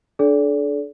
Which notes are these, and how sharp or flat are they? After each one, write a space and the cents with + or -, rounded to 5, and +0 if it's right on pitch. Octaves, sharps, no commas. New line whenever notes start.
D4 +5 A4 -35 D5 -35